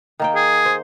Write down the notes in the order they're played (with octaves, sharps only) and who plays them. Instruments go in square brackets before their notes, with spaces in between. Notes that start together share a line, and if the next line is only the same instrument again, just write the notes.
[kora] D#3 A#3 G5
[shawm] G#4
[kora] C5